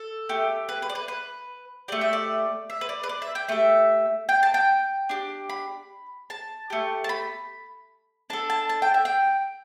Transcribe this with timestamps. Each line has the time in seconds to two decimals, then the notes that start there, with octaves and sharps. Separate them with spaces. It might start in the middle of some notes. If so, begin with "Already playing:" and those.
Already playing: A4
0.29 A3 G4
0.69 B4
0.82 B4
0.90 D5
0.95 B4
1.08 B4
1.88 A3 G4 D5
2.01 E5
2.13 D5
2.70 E5
2.81 B4
2.89 D5
3.03 B4
3.09 D5
3.22 E5
3.35 G5
3.49 A3 G4 E5
4.29 G5
4.43 A5
4.54 G5
5.09 D4 G4
5.50 B5
6.30 A5
6.70 A3 G4
7.04 A5
7.09 B5
8.30 D4 A4 A5
8.50 A5
8.69 A5
8.82 G5
8.94 E5
9.05 G5